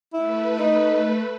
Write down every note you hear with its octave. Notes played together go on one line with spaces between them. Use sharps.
A3 E4 B4
D#4